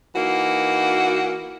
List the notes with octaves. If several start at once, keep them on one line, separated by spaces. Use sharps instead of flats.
E3 A#3 D#4 F#4